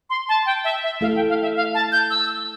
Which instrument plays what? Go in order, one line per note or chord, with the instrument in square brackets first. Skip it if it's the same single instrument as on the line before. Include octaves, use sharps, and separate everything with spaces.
[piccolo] C6
A5
G5
E5
E5
[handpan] A3 E4 A4 [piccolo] F5
[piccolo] G5
F5
E5
F5
A5
G6
E6